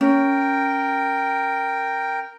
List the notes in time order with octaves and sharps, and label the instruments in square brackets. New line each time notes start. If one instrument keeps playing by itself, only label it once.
[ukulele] C#4 [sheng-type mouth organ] A#4 G5